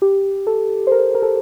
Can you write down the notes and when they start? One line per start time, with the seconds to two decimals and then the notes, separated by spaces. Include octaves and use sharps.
0.02 G4
0.47 A4
0.87 C5
0.92 A#4
1.15 A#4
1.22 A4